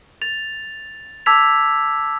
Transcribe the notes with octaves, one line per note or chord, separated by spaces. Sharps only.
A6 F7
A5 D6 E6 G#6 B6 F7